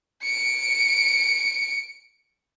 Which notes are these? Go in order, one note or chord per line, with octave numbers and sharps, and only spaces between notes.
C#7 D7